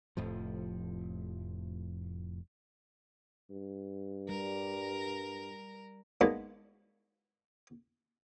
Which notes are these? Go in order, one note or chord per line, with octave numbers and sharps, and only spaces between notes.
F1 F2 A2 F3
G2
G3 A#4
G#3 A#3 B3 D4 D#4 F#4